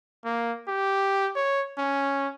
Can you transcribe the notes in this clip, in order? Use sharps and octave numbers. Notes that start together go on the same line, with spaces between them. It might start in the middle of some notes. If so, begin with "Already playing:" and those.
A#3
G4
C#5
C#4